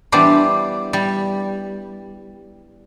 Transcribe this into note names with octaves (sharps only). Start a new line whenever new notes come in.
E3 G3 B3 D4 G4 C5
G3